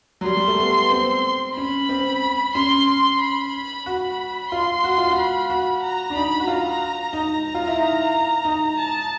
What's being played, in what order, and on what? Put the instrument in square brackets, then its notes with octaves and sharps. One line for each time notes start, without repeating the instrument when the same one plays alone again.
[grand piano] F#3
[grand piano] G3 [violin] C6
[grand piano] G3
A3
B3
C4
[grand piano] C#4 [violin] B5
[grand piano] C4
[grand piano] C#4 [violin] C6
[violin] C6
B5
[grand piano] F#4 [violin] B5
[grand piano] F4 [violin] C6
[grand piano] F#4
F4
F#4
[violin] B5
[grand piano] F#4
[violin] A#5
[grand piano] D4
[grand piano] D#4 [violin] B5
[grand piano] F#4
[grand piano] F4 [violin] A#5
[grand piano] D#4
[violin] A#5
[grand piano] F4
E4
D#4
D#4
[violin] A5